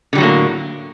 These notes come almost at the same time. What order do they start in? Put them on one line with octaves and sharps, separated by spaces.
D3 G3 F#3 A2 A#3